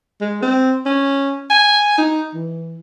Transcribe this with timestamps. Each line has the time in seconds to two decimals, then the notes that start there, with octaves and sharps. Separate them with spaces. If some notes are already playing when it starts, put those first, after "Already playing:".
0.21 G#3
0.42 C4
0.86 C#4
1.50 G#5
1.98 D#4
2.35 E3